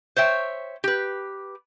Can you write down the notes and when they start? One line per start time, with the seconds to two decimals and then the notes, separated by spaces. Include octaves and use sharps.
0.17 C5 C#5 E5 G5
0.84 G4 B4